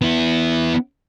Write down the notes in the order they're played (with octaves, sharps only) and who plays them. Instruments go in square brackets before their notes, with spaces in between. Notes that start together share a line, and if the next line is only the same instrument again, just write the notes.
[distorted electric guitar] B3 E4